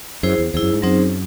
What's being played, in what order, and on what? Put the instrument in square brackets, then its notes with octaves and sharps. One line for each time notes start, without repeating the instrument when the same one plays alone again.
[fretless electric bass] F#2 [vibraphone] E4 G#4 C5
[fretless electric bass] E2
[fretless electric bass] E2 [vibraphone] E4 G#4 C5
[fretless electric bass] F#2
G#2
[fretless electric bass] F#2 [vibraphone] F#3 C4 D#4 G#4 C5